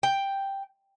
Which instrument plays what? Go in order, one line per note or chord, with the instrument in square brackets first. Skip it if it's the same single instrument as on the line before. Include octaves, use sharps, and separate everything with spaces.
[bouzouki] G5